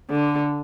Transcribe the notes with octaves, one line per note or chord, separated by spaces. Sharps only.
D3